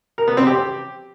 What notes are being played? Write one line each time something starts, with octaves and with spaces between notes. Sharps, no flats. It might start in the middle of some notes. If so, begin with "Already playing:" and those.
A#4
B3
C4
G4